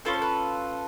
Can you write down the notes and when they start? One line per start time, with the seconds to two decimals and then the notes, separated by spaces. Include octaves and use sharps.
0.05 C#4 F4 A4 B4
0.13 C5
0.22 B4